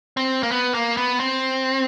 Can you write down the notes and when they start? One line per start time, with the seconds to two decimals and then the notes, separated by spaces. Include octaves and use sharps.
0.17 C4
0.43 A#3
0.51 B3
0.74 A#3
0.97 B3
1.20 C4